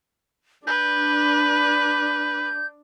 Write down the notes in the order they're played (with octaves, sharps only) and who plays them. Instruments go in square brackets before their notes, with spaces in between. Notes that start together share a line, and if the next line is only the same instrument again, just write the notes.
[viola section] D4 [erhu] B4 [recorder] G6